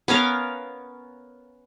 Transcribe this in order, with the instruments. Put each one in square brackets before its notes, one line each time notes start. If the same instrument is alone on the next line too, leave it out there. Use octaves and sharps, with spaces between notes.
[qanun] B3 C#4 A#4 F5